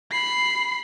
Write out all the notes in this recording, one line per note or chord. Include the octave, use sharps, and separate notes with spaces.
B5 C7